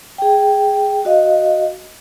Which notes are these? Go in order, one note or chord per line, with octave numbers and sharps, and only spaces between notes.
G#4 G5
F#4 D#5 F5